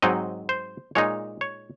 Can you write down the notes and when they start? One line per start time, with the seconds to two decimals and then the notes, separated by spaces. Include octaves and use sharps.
0.02 G#2 F#3 C4 D#4 D#5
0.49 C5
0.95 A#2 G#3 D#4 C#5
1.41 C#5